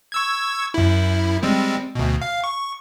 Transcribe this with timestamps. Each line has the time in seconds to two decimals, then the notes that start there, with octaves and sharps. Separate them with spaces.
0.12 C#6 E6 G#6
0.74 F#2 E4
1.43 G3 G#3 C4
1.95 D2 B2
2.22 F5
2.44 C#6